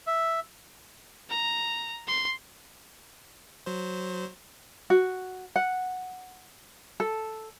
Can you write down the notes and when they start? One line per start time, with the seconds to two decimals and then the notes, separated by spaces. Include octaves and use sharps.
0.07 E5
1.30 A#5
2.08 C6
3.66 F#3 C5
4.90 F#4
5.56 F#5
7.00 A4